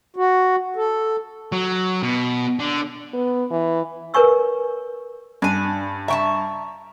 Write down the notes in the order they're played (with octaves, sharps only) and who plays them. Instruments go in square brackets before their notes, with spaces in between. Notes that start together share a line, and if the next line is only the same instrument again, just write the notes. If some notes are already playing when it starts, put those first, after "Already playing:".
[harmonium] F#4
A4
[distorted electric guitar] F#3
B2
D3
[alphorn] B3
E3
[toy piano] A#4 B4 C#5 G#5 C#6 E6
[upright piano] G2 [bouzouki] D4 G#5
[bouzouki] E5 G5 A5 [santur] A#5 C#6